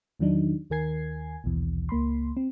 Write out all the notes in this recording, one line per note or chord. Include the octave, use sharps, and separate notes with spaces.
E2 D#3 F#3 D4 D#4
D#2 D#3 A#4 G#5 G#6 C7
A#1 D#2 B2 E3
C#2 A#3 B5 C6
C4